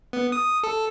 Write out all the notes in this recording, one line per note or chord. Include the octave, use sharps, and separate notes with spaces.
B3
D#6
A4